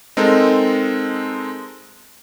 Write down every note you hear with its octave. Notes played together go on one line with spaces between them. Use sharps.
G#3 C4 D#4 A4 A#4